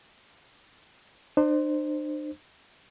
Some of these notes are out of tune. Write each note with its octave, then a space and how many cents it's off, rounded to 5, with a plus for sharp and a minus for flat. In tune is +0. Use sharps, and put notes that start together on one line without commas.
D4 +45 C5 +0